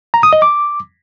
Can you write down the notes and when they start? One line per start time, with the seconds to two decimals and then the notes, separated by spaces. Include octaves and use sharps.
0.14 A#5
0.23 D#6
0.33 D#5
0.42 D6